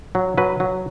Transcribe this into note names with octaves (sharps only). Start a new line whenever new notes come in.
F#3
F#3 B4
F#3